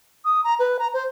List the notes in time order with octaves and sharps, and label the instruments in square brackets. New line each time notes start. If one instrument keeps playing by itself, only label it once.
[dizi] D#6
A#5
B4
A#5
C5